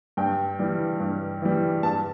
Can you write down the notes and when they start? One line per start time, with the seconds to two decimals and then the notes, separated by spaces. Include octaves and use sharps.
0.17 G2 G5
0.59 E3 G3
1.00 G2
1.42 E3 G3
1.83 G2 A5